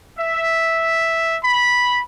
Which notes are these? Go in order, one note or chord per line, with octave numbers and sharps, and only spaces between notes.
E5
B5